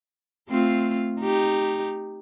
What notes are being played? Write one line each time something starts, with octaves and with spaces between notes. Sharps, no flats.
A3 C4 F4
D#4 G4